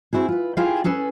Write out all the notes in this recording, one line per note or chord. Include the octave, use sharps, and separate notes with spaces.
C4 E4 F#4 G#4
F4 B4
E4 F4 G4 G#4 F5 G5
C#4 G#4 A4 B4